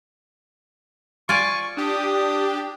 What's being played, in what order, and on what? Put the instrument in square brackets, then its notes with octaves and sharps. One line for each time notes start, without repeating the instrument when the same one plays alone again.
[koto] F4 D5 G#5 [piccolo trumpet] C#6
[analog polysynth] D4 G4 [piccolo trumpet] D#6